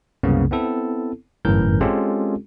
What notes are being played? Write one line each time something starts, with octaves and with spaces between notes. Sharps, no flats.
C2 F#2 C#3 A#3 B3
B3 C4 E4 A4
G1 F#2 A2 E3 A#4 G6
G#3 C4 C#4 F4 G4 A4